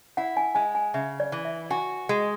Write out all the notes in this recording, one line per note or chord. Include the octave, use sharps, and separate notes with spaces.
E4 F#5
G#5
G#3 G#5
G#5
C#3 E5
D5
E3
E5
F#4 G#5
G#3